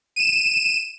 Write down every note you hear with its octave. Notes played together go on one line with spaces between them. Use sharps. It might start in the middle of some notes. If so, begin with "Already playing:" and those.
D#7 E7